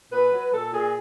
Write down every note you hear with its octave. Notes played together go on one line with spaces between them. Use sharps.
A#2 B4
F#3
A#2 A4
A#2 G#4